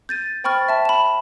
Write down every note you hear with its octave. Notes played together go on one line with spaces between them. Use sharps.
G6 A6 D#7
C5 G5 B5 C#6 F6 A6
E5 A5 F6
B5 E7